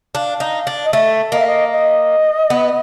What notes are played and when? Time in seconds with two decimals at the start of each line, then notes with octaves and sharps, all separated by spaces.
0.15 D4 F5
0.40 D#4
0.67 D4
0.84 D#5
0.93 A3 E5
1.32 A#3 D#5
1.39 E5
1.47 D#5
1.72 D#5
2.50 B3